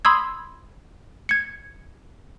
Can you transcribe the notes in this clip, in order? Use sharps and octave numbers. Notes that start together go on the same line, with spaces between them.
B5 C6 D#6 E6 G#6
G#6 C#7